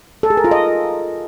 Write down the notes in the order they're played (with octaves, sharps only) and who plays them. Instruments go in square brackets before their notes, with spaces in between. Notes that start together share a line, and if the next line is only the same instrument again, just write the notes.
[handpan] A4
G#4
A#4
F4
D#5